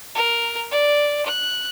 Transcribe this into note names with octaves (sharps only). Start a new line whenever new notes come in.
A#4
D5
F#6